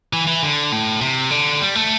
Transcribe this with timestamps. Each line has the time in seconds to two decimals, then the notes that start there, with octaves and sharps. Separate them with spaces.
0.13 E3
0.27 E3
0.42 D3
0.72 A2
1.01 C3
1.31 D3
1.61 G3
1.75 A3